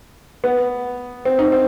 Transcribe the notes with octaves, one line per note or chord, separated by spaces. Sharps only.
B3
C4
D#4
C4